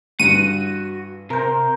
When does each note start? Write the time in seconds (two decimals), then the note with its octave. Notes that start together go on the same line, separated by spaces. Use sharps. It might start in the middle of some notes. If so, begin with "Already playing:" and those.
0.20 G2 D3 E3 F#4 F#5 D#7
1.30 C3 A#4 C5